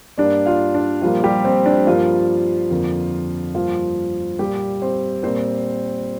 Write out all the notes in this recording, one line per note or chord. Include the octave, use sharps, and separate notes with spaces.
G2 G3 A#3 D4 D5
F4 F5
D4
A#2 F3 G3 A#3 F4
G3 G4
C4
D4
G2 F3 G3 A#3 F4
F2 D3 A#3
G2 F3 A#3 F4
A#2 G3 A#3 G4
C4 C5
A#2 G3 A#3 C4 C5